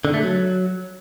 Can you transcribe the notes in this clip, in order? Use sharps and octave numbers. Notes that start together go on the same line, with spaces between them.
D3
A3
F#3